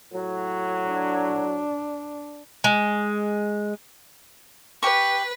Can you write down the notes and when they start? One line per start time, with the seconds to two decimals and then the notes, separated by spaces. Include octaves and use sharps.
0.12 A2 F#3
0.87 D4
2.64 G#3
4.83 G4 B4 C#6